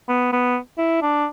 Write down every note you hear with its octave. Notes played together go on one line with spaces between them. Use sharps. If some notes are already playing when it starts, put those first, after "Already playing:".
B3
B3
E4
D4